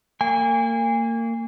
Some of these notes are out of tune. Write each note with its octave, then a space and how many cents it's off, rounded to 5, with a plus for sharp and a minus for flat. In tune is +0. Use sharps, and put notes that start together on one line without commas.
A#3 -30 G#5 -35